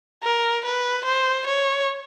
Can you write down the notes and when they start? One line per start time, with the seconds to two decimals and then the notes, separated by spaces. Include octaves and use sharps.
0.23 A#4
0.65 B4
1.05 C5
1.47 C#5